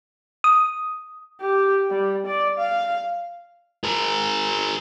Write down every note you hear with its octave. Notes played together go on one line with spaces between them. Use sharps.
D#6
G4
G3
D5
F5
G#4 A#4